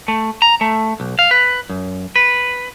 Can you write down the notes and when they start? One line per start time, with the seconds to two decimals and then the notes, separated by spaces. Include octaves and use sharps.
0.08 A3
0.42 A#5
0.61 A3
1.00 B1
1.19 F5
1.31 B4
1.70 F#2
2.16 B4